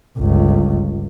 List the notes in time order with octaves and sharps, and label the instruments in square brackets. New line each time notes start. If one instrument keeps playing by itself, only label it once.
[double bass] G1 C#2